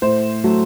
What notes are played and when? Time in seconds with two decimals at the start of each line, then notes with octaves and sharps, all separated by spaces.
0.02 A2 C5
0.44 F#3 A3